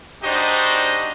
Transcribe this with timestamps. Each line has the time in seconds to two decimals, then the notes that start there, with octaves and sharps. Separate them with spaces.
0.23 D4 D#4 F#4 G4 C5 D#5